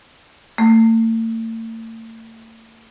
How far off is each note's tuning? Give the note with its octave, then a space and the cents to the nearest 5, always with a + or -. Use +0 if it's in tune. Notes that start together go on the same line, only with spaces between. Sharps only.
A3 +45